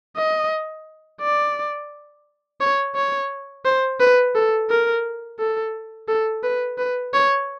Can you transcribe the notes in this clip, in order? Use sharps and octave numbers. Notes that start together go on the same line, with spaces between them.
D#5
D5
C#5
C#5
C5
B4
A4
A#4
A4
A4
B4
B4
C#5